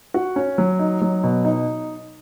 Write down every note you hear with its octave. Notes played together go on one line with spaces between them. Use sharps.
F#4
C#4
F#3
D#4
F#3
B2
D#4